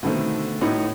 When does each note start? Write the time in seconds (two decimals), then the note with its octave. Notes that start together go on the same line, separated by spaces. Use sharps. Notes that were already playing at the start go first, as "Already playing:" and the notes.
0.03 B2 D3 D#3 A3 C4
0.61 A2 B3 D#4 F#4